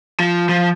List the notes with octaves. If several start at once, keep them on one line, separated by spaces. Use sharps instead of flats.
F3
F3